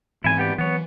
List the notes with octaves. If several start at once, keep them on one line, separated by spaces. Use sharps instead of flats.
G#2 E3 C4 E4 G#5
B3 G4 D5
E3 F#3 B3 C#5